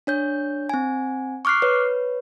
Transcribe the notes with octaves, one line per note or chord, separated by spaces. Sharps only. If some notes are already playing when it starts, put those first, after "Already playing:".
D4 C#5 G6
C4 G#5
C#6 D6 F6 F#6 C7
B4 C#5